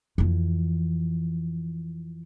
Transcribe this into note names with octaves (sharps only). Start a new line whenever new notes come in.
F2 E3